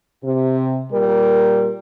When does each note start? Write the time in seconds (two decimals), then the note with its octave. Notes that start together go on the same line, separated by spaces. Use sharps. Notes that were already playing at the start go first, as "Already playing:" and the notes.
0.24 C3
0.92 A#2 G3 A#4